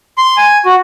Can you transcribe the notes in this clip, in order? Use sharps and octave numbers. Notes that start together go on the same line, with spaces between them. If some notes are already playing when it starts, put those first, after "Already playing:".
C6
G#5
F#4